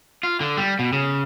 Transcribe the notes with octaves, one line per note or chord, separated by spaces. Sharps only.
F4
D3
G3
B2
C#3